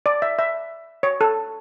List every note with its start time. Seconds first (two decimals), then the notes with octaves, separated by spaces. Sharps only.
0.06 D5
0.22 E5
0.39 E5
1.03 C#5
1.21 A4